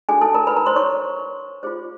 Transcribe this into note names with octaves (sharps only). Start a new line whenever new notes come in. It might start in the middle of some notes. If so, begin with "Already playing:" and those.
D4 F#4 G#4 A4 G#5
A4 A5
A#4 A#5
B4 B5
A#4 A#5
C5 C6
C#5 C#6
F4 G#4 C5